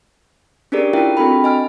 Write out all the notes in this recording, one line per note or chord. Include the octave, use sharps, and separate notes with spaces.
C#4 D4 G4 G#4 A#4 D5
E4 F4 G#4 A#4 E5 G5
C4 D4 F#4 A4 G5 B5
D#5 G#5 F6